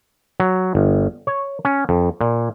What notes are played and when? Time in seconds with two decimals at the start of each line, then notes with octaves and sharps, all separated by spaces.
0.40 F#3
0.75 G1
1.27 C#5
1.65 C#4
1.89 F2
2.21 A#2